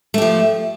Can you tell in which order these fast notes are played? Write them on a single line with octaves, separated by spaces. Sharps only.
A3 G4 F3